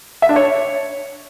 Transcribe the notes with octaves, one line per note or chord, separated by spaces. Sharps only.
E5
D4
C#5